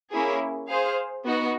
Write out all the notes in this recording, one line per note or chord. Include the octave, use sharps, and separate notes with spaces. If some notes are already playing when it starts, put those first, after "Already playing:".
A#3 C#4 E4 G#4
G#4 C5 F5
B3 D#4 F#4